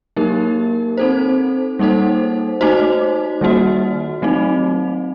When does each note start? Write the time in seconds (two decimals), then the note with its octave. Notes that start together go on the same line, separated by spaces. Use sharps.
0.16 F#3 A#3 D#4 G4 A#4
0.97 C4 D#4 A4 C5
1.79 G3 A#3 D#4 A4 C5
2.61 A3 D#4 F#4 C5
3.41 D#3 G3 A#3 F#4
4.22 F#3 A3 C4 D#4